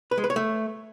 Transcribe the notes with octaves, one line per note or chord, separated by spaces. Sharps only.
B4
G#3
B4
C#5
A3